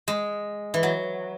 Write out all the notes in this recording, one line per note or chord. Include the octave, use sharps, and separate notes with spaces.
G#3
E3
F#3